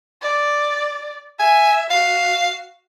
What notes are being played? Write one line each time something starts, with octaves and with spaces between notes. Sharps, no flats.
D5
E5 G#5
F#4 F5